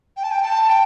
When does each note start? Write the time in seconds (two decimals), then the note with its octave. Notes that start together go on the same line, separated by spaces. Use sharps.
0.17 G5
0.24 A5
0.32 G5
0.43 A5
0.69 G5